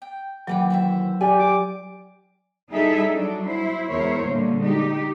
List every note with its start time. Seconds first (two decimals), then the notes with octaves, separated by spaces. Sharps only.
0.02 G5
0.47 D#2 E3 F#3 G4 B4 G5
0.70 F#4 C5 E5
1.21 F4 G4 D5 G#5
1.40 D6
2.72 G3 D#4 E4 G#4 A4 E5
3.14 F#3 D4
3.47 E4 C5
3.91 E2 G#3 E4 A#4 C5 C#5
4.24 A#2 D3 G3 A#3
4.62 G#3 D#4 G4